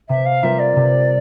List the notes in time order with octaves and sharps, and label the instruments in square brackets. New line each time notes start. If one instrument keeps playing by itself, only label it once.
[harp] C3 [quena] E5
[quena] F5
[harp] G3 C4 F4 A#4 [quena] E5
[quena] D5
[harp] C3